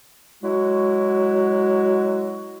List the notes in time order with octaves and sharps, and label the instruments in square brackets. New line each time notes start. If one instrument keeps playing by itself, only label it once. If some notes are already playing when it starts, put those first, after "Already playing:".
[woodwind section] F#3 G#3 E4 F#4